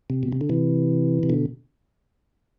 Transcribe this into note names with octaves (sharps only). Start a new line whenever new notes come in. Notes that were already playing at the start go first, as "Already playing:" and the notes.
C3
B2
C3
D3
C3 E3
C3
B2 D3